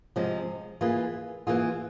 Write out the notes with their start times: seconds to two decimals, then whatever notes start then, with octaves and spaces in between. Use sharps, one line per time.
0.16 C3 F3 G#3
0.81 E3 A#3 F4 G#4
1.47 E3 A#3 F4 G#4